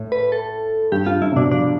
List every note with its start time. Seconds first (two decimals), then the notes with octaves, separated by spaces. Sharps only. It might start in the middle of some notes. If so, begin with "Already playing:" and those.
Already playing: A2
0.12 B4
0.32 A4
0.92 G2 G4
1.06 G2 F4
1.22 G2 E4
1.32 C3
1.36 B2 D4
1.51 F3 D4